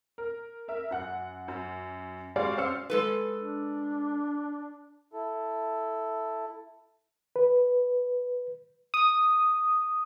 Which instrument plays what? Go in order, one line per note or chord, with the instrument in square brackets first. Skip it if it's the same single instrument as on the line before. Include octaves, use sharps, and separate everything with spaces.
[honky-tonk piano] A#4
A#4 E5
F#2 F#5 F#6
F#2
G3 G#3 F#4 C#5 D5 F5
C#4 C5 F5 E6 C#7
[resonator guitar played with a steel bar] G#3 A4 B4
[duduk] D4
[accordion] E4 A4
[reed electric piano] B4
[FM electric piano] D#6